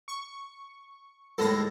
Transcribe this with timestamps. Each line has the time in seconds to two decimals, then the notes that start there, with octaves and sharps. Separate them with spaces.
0.08 C#6
1.38 D#2 A2 G#3 A4 A#6